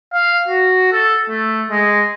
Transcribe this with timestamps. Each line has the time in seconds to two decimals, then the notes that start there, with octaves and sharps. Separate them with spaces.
0.13 F5
0.48 F#4
0.93 A4
1.29 A3
1.71 G#3